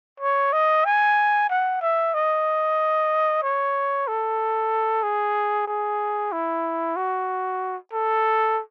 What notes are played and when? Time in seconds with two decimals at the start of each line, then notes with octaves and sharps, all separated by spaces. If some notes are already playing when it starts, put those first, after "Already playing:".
0.20 C#5
0.53 D#5
0.85 G#5
1.50 F#5
1.82 E5
2.14 D#5
3.43 C#5
4.08 A4
5.03 G#4
5.67 G#4
6.32 E4
6.96 F#4
7.93 A4